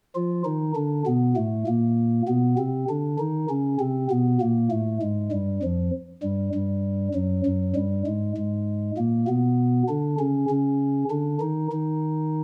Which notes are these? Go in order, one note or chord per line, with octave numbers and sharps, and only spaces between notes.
F3 F4
D#3 D#4
D3 D4
B2 B3
A2 A3
A#2 A#3
B2 B3
C3 C4
D3 D4
D#3 D#4
C#3 C#4
C3 C4
B2 B3
A#2 A#3
A2 A3
G#2 G#3
G2 G3
F2 F3
G2 G3
G2 G3
F#2 F#3
F#2 F#3
G2 G3
G#2 G#3
G#2 G#3
A#2 A#3
B2 B3
D3 D4
C#3 C#4
C#3 C#4
D3 D4
D#3 D#4
D#3 D#4